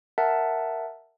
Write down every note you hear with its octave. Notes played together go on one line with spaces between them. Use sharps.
A#4 E5 F#5 A5